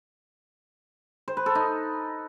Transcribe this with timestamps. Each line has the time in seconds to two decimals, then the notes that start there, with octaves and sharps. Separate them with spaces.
1.28 C5
1.37 B4
1.46 A4
1.55 D#4